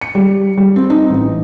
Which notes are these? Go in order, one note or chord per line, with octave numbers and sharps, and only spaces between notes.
C#7
G3
G3
C4
D#4
A1